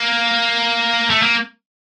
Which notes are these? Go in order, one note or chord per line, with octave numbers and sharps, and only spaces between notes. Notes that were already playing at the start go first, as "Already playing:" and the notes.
Already playing: A#3
A3
A#3